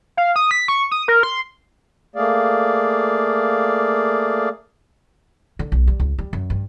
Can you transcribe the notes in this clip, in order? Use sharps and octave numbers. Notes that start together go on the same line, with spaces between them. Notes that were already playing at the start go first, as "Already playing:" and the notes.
F5
D#6
B6
C#6
D#6
A#4
C6
A3 A#3 G#4 D5 F5
D3
B1
G3
C#2
G3
F#2
G2